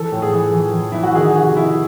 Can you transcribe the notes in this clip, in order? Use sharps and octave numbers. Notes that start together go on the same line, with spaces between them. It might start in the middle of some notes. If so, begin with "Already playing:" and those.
Already playing: E3 A4
A2
G#4
E3
E3
E3
E3 E4
F#4
D#3 G#4
C3 F#4
C3 E4